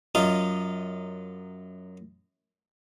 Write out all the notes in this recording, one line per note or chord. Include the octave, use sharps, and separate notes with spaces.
F#2 F4 D#5 A#5